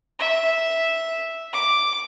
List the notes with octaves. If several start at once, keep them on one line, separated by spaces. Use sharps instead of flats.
E5
D6